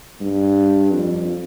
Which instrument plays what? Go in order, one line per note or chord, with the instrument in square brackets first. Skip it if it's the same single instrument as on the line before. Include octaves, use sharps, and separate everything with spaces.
[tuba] G2
F2